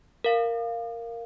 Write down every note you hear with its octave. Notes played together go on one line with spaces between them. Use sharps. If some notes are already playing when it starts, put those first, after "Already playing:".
A#4 F5